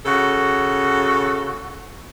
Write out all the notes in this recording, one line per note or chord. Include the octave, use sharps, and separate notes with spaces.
C#3 F#4 A4